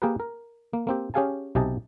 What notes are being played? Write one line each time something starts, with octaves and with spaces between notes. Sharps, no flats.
A#3 G4 G#4 A#4 B4
A#4
A#3
A#3 C4 G4
C#4 G4 G#4 F5 G#5 A5
B1 C3 G4 D#5 G#5 A5